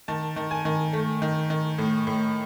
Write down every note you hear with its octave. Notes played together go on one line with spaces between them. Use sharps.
D#3 A5
D#3
G#5
D#3
A3
D#3
D#3
A2
A2